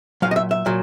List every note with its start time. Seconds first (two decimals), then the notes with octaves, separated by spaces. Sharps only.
0.22 A#2 F#3 F5
0.31 D#5
0.36 E5
0.51 E5
0.66 A#2 F#3